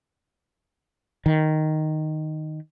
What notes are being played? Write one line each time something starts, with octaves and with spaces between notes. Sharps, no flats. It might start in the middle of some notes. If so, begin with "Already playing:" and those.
D#3